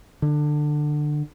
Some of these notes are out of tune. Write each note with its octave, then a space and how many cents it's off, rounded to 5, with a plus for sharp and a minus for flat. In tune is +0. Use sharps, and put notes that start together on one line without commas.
D3 +20